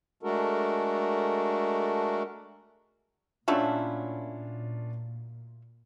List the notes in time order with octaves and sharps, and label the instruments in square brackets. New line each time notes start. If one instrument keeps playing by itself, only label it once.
[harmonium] G#3 A3 D4 F#4 A4 A#4
[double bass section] A#2 [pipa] F#3 A3 E4 [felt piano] C#4 D4 F4